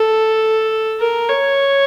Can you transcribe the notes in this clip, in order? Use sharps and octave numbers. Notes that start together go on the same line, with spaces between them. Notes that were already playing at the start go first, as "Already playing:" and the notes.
Already playing: A4
A#4
C#5